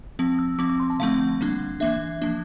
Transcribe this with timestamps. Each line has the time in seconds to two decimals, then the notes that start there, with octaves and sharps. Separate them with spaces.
0.19 F3 C4
0.39 E6
0.59 F3 C4 D6
0.69 D6
0.80 C6
0.90 A5
1.00 D3 F3 A3 C4 F5
1.41 D3 G3 A#3 D4
1.80 E3 A#3 D4 E5
2.22 F3 A#3 D4